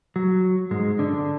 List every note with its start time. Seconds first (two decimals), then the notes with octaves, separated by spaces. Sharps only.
0.16 F#3
0.71 G#2 G#3
0.99 D3 D4